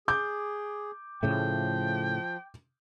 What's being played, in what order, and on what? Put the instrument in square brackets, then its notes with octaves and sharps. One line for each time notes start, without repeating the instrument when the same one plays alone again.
[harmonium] G#4 [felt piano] D6 G6
[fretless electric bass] A2 C#3 A3 [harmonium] F3 [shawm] G5